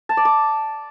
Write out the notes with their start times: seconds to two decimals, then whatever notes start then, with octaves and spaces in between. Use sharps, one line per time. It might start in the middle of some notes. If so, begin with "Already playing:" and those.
0.09 A5
0.17 D5
0.25 D6